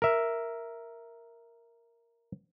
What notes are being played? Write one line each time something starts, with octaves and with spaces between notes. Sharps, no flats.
A#4 E5